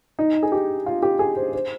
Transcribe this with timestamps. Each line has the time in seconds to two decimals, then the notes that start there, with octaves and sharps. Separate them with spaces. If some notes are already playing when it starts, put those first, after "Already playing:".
0.19 D#4
0.43 G#4
0.52 G4
0.86 F4
1.03 G4
1.19 G#4
1.37 C5
1.53 C5